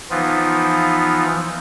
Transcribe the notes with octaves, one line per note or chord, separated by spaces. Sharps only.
E3 F3 B3 D#4 F4